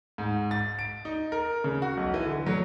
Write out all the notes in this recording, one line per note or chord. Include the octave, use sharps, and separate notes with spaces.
G#2
A6
D7
D#4
A#4
C#3
F#4
B1
E3
D3
F#3